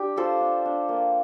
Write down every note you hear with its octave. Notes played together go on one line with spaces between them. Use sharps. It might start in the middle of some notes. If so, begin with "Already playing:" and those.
Already playing: D4 G4
F4 A4 C5
D4
D4
A#3